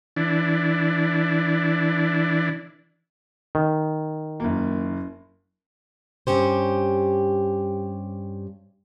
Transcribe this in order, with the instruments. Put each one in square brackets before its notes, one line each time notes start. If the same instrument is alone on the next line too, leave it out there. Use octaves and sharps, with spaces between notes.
[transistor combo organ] E3 D4
[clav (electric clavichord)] D#3
[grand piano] F#1 A#3
[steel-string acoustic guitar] G2 C#4 G4 C5